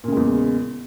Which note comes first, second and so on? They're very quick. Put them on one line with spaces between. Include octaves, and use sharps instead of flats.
A#2 C#3 G#3 E2